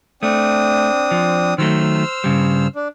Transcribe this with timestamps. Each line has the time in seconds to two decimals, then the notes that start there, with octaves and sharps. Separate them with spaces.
0.23 A3 C4 D4 D#6
1.11 F3
1.58 D#3 F#3 A3 C5 E6 F6
2.24 G2 C#3 G3
2.76 D4